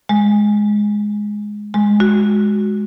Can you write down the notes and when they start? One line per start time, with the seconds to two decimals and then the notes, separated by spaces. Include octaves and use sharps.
0.09 G#3
1.74 G#3
2.00 F#4